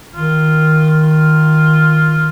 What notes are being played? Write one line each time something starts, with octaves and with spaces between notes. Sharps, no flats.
D#3 F4
F4